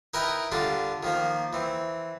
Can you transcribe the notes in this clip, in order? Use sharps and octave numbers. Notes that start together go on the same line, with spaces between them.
D#4 E4 A#4 B4 D#5 G5
D3 G3 D4 F4
D#3 F3 A#3
E3 C4